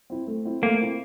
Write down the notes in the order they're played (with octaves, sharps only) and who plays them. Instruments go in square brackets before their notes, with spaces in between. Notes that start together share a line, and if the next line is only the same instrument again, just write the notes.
[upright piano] C4 E4
A3
C4 E4
[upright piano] A3 [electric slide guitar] A#3
[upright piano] C4 E4